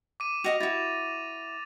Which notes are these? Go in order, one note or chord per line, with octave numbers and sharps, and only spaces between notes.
D6 D#7
F#4 D#5 F5 A#6 F7
E4 F#4 A6